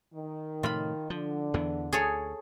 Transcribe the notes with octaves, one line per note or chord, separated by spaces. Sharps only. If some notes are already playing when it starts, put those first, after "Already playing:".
D#3
A2 C3 F3 F4 B5
D3 F3
E2 E3 B3
D2 G#4 A4 C#5